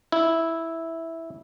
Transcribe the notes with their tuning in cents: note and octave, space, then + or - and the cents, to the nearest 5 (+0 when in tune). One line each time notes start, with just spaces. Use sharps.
E4 -5